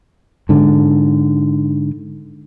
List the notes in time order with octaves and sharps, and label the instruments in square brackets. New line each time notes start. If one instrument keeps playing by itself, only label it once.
[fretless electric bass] G#2 D3